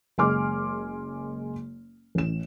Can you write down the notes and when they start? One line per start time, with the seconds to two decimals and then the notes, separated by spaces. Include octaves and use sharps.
0.18 F#1 G#3 G#5 C6 D6 F6
2.15 A1 E7